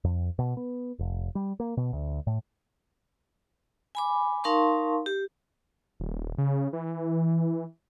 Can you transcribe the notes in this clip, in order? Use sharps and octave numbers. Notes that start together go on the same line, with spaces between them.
F2
B2
B3
F1
G3
A#3
B2
D2
A2
G#5 B5 D6
D#4 A#4 F5 A5 C6 C#6
G4
D#1
C#3
E3